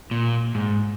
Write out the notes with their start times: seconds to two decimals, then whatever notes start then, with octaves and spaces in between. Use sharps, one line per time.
0.11 A#2
0.55 G#2